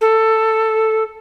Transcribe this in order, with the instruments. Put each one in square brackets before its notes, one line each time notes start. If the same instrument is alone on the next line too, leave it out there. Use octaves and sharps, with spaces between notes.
[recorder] A4